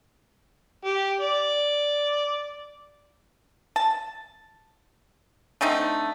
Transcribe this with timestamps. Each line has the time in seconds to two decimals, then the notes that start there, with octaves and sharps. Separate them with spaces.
0.85 G4
1.21 D5
3.76 A5
5.61 D3 A3 C4 D#4